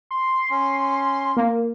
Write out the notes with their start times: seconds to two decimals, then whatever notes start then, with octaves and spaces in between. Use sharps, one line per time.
0.11 C6
0.51 C#4
1.37 A#3